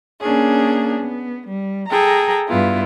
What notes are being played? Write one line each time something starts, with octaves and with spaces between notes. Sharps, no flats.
A#3 C#4 D4 G#4
B3
G3
G#4 A4 G5 A#5
G2 B3 E4 F4